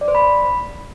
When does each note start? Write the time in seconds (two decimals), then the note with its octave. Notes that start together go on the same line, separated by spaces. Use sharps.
0.01 D5
0.08 C5
0.15 B5